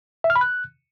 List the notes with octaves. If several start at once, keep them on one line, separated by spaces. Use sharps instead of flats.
E5
F6
B5
F#6